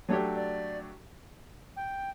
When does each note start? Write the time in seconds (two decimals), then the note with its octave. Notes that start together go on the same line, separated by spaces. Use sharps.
0.08 F#3 A3 D4 G4 C#5
0.36 D5
1.76 G5